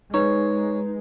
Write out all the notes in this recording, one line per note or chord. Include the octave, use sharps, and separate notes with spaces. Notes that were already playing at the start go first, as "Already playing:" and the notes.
G#3 D#4 B4 C#5